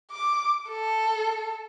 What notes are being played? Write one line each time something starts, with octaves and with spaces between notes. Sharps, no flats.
D6
A4